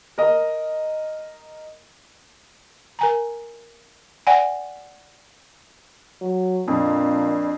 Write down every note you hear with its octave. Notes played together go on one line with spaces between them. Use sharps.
A#4 D#5
A#4 G#5 A#5
D5 F#5 G#5
F#3
F2 A#2 D4